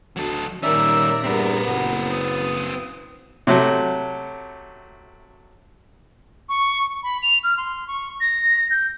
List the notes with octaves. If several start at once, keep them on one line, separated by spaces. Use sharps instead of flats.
D2 F#3 A4
A#2 D#3 G3 C#4 A#4 D5 E5 E6
E2 G2 C4 B4
F#1 B3
D#6
C3 F#3 A3
C#6
B5
F7
F6
C6
C#6
A#6
G6